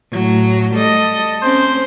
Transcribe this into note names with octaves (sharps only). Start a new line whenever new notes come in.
A2 F#3
G3 A4 D#5
C4 C#4 C5